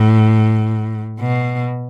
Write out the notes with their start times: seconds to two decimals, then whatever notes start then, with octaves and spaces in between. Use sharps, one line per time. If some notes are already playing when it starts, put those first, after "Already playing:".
Already playing: A2
1.20 B2